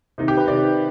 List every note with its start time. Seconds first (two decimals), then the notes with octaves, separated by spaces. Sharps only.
0.18 C3 D#3 D#4
0.28 G4
0.37 B4
0.47 C3 D#3 D5